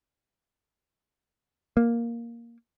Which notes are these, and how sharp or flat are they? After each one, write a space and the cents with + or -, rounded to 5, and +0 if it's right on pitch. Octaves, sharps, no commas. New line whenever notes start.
A#3 +5